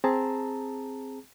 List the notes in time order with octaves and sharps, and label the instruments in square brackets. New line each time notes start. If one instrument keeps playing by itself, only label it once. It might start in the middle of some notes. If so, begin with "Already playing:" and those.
[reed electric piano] C4 G#4 A5 A#5